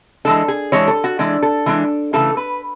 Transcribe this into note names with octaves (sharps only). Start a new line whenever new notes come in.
E3 G#3 D4 A4
G#4
E3 G#3 D4 C#5
A4
F#4
E3 G#3 D4
A4
E3 G#3 D4
C#3 E3 A3 A4
B4